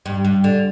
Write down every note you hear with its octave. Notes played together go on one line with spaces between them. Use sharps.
G2
G2
D3